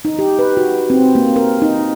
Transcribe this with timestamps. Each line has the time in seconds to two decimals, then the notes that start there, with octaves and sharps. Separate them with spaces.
0.05 D#4
0.19 G4
0.39 B4
0.57 F#4
0.90 C4
1.15 A#3
1.36 A#4
1.62 D#4